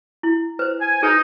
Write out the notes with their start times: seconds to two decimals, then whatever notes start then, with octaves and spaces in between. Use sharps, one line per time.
0.23 E4
0.59 B4 C5
0.80 G#5
1.03 D#4 G#4 B4